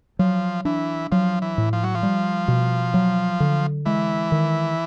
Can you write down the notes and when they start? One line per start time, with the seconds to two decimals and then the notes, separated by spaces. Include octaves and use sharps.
0.19 F3 F#3
0.65 E3 D4
1.12 F3 F#3
1.42 E3
1.58 A2
1.73 F3
1.83 F#3
1.95 F3
2.03 G3
2.48 B2
2.94 F#3
3.40 D3
3.86 E3 G#3
4.32 D#3